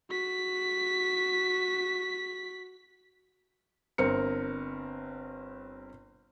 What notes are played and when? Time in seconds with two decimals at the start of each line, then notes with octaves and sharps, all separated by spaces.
0.10 F#4 B6
3.98 G1 C4 A#4 C#7